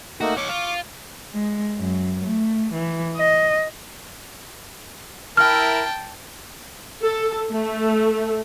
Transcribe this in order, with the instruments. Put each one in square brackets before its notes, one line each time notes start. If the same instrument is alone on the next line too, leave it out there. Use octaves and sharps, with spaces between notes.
[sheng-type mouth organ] A3 A#3 D#4 [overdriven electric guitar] F#4
[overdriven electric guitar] D#4 C#5 [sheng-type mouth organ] C#6 D6
[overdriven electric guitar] F4
[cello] G#3
F#2
A3
E3
D#5
[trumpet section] E4 A#4 [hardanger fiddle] G5 A5 [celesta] F6
[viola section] A4
A3